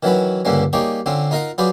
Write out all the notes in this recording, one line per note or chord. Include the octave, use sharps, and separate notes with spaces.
D#3 E3 F#3 C#4 F#4 B4
C#2 G2 D3 G3 A#3 C#4
G3 A#3 D#4 G4 G#4 C#5
D3 C4 C#4 F4
D#4 F4 A#4 D#5 F5 F#5
F#3 F4 G#4 B4 C5 D5